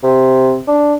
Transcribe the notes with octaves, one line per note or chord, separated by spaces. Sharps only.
C3
D4